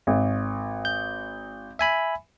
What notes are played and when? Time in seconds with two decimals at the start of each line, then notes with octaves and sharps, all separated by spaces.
0.07 G#1
0.85 G6
1.79 E5 G#5 B5